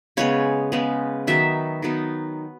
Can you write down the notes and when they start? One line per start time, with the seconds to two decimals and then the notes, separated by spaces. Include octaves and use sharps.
0.17 C#3 G#3 B3 C#5
0.72 C#3 G#3 B3
1.27 D#3 F#3 B3 D#4 E5
1.82 D#3 F#3 B3 D#4